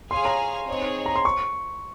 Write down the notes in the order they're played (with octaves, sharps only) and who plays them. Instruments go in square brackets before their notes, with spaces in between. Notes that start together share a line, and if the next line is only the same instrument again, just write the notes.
[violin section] G#4 C#5 F5 G#5 [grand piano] C6
[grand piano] A#5
[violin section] C4 D#4 G#4 C#5
[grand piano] A#5
C6
C#6